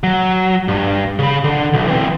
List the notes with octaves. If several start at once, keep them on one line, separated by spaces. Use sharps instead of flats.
F#3
G2
C#3 B5
D3
B1
E3 C4